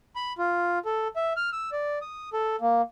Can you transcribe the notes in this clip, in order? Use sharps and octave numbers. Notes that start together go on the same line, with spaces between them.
B5
F4
A4
E5
F6
E6
D5
D#6
A4
A#3